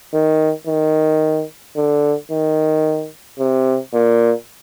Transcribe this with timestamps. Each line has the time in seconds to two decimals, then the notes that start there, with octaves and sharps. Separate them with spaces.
0.14 D#3
0.67 D#3
1.76 D3
2.31 D#3
3.39 C3
3.94 A#2